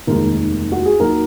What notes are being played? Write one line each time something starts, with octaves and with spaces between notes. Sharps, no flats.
F1 D#2 D#3 G#3 A#4
F#4
G#4
D#2 D#3 F#3 A#4